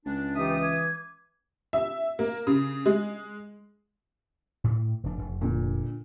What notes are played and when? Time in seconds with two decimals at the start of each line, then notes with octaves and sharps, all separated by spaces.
0.06 C#2 D4
0.36 E3 D#4 F4 G4 E5 D#6
0.62 D6 G#6
1.73 E5
2.19 A#3
2.47 C#3
2.86 G#3
4.64 A2
5.04 F1 D4
5.18 F1
5.41 A#2 D3